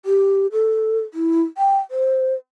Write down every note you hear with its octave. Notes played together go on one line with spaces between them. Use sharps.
G4
A4
E4
G5
C5